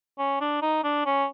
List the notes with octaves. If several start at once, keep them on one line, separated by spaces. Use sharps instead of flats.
C#4
D4
D#4
D4
C#4